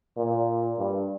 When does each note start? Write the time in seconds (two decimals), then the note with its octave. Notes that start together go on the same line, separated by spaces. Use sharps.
0.17 A#2
0.79 G2